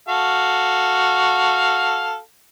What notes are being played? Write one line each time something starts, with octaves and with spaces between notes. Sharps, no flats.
F#4 A4 F5